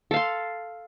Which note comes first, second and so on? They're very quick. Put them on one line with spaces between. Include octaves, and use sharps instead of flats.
A4 F5 C6